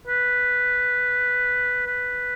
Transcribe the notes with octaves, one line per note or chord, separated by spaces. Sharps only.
B4
B4